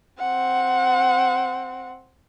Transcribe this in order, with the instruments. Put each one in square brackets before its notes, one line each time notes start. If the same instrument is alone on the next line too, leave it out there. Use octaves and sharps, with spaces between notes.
[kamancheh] C4 F#5